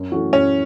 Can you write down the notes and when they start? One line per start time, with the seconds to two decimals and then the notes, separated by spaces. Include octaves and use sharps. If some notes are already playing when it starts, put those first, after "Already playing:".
Already playing: F#2
0.12 E3 A3 C#4 F#4
0.32 F#2 C#4